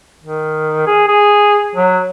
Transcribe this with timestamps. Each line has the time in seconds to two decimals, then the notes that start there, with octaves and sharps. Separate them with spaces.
0.24 D#3
0.87 G#4
1.08 G#4
1.75 F#3